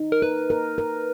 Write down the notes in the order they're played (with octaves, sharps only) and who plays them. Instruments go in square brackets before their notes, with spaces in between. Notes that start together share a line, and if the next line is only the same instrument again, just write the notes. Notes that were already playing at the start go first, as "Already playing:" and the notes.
Already playing: [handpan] D#4
[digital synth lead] A#4
[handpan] A#4 [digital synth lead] B4
[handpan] A#4
A#4